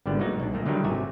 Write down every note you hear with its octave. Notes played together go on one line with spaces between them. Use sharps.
G#1 D3 G3 B3 E4
F#3 G#3 A#3 B3 D#4 F#4
C2 B2 D4
A#2 D#3 A3 A#3
D3 D#3 F#3 G3 D#4 E4
G#1 C3 A3 F#4 G#5